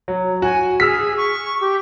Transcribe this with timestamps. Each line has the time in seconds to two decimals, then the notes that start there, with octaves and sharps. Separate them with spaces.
0.08 F#3
0.42 F#4 G#5
0.80 G#4 E6 F6 B6
1.17 C#6
1.60 G4